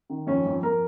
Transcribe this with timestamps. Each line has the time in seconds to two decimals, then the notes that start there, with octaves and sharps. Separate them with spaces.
0.10 D#3
0.27 F2 C#4
0.46 F2
0.63 F2 A#4